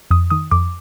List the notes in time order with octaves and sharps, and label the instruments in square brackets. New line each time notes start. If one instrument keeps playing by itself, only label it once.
[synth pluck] F2 D#6
D#3 D#6
F2 D6